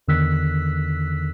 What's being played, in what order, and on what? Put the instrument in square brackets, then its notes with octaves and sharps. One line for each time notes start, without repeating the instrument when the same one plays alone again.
[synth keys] E2 D3 D#3 E6 F#6 B6